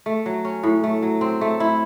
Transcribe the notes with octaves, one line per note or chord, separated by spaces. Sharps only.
A3
F#3
C#4
A2
A3
F#3
C4
A3
E4